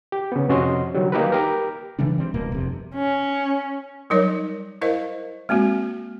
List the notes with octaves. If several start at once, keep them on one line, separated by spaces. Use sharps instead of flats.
G4
C#3 B3
F2 C3 C#4 F#4 D#5 C6
D3 D#3 F#3 G3
A#3 D#4 G4 A#4 B4
G4 A#4
C#3 E3 G3 D4
G3 C4
E1 B2 A#3
F1 C3
C#4
F#3 G3 D#4 A#4 C#5 D5
E4 A#4 C5 D#5 F5
G#3 A#3 C4 F#4